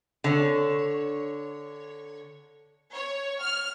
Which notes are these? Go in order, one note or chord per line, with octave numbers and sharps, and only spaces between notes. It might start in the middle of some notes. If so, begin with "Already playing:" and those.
D3 C#5
C#5
F6